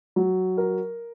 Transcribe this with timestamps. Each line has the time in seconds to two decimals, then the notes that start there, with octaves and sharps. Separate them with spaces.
0.16 F#3
0.58 A#4